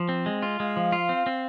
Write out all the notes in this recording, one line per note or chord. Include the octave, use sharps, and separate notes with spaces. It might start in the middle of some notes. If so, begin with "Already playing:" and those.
Already playing: F3
C4
G#3
F4
G#3 F5
F3
F4
C4
C4